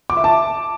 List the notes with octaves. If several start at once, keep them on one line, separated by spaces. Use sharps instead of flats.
D6
E5
A5